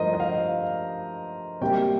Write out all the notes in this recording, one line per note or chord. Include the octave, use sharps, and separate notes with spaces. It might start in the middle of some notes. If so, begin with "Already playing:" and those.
Already playing: G2 F3 A3 A#4 C5 D#5
D#5
F5
C3 G3 A#3 G5